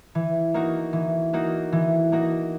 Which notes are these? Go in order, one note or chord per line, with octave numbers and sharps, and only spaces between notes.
E3
A#3 D#4 F#4
E3
A#3 D#4 F#4
E3
A#3 D#4 F#4